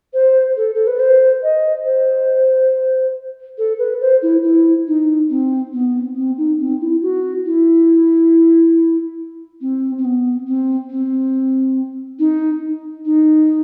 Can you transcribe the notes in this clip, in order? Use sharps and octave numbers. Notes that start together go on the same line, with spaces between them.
C5
A4
A4
B4
C5
D#5
C5
A4
B4
C5
E4
E4
D#4
C4
B3
C4
D#4
C4
E4
F#4
E4
C4
C4
B3
C4
C4
D#4
D#4